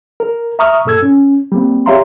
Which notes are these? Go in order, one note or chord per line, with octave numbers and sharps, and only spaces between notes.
A#4
E5 A#5 C#6 D#6 F6
G2 A#2 A4 E6 G#6
C#4
G3 A#3 C4
G4 C#5 E5 F5 A#5 C6